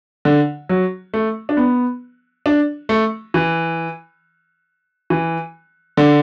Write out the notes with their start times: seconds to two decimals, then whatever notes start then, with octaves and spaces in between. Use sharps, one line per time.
0.25 D3
0.69 F#3
1.14 A3
1.49 D4
1.57 B3
2.46 D4
2.89 A3
3.34 E3
5.10 E3
5.97 D3